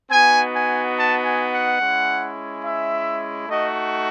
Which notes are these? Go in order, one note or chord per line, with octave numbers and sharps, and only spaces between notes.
B3 D#4 F#4 G#5
G#5
A5
G#5
F#5
G#3 C#4 E4
E5
A3 D#4 F#4 D#5